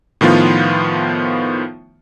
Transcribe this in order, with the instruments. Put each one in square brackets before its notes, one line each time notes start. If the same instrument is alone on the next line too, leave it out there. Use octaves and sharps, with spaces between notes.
[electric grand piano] A2 D#3 F3 B3 F4